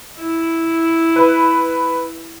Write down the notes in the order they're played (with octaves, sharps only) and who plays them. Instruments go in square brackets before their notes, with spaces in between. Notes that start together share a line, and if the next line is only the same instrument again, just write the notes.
[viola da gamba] E4
[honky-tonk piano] B4